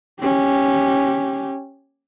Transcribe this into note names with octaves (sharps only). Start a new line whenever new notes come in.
C#4 G4